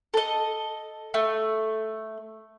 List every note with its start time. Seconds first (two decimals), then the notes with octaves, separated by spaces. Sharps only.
0.14 A4 D#5
1.14 A3